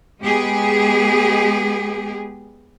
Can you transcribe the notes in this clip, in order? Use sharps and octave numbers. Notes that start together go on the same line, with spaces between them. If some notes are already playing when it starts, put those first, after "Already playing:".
G#3 B3 G4 G#4